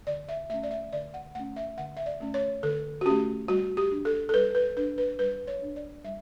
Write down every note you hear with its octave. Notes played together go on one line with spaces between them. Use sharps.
D3 D5
E5
A3 C#4 E5
D5
E5
D3 D5
F#5
A3 C#4 F#5
E5
D3 F#5
E5
D5
A3 C#4
C#5
D3 A4
F#4
A3 C#4 G4
G3 F#4
G4
D4
A4
A4
G3 B4
B4
D4 B4
B4
G3 B4
C#5
D4
D5
G3 E5